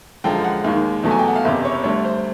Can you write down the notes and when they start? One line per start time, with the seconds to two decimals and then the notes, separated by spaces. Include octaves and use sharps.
0.24 F#2 D3 F3 G#3 G5
0.44 F#5
0.64 D#2 D#3 G#3 F5
1.03 E2 B2 F#3 A3
1.11 G#5
1.19 G5
1.28 F#5
1.36 F5
1.44 F#1 E2 C3 E5
1.65 C#5
1.83 D2 D3 G3 C#5
2.05 C5